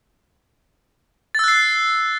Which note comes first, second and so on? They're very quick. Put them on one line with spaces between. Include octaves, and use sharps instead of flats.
A6 E6 F#6 C7